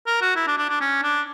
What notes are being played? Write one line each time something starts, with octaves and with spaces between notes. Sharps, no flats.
A#4
F#4
E4
D4
D4
D4
C#4
D4